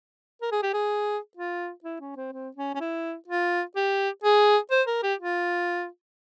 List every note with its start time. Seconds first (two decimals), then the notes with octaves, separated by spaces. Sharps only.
0.42 A#4
0.52 G#4
0.63 G4
0.74 G#4
1.37 F4
1.84 E4
2.01 C#4
2.16 C4
2.32 C4
2.56 C#4
2.75 C#4
2.80 E4
3.28 F4
3.76 G4
4.24 G#4
4.71 C5
4.87 A#4
5.03 G4
5.19 F4